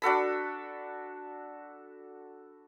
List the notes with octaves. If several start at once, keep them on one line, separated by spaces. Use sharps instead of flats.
D4 F#4 A4 B5